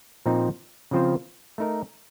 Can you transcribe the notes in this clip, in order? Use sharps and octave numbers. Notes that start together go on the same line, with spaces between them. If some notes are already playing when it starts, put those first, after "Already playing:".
A#2 F3 C4 D#4
C#3 F3 C4 F4 C5
A3 D#4 A#4